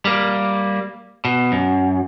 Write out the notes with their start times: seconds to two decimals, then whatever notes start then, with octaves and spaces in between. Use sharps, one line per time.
0.05 G3 A#3
1.25 B2
1.52 F#2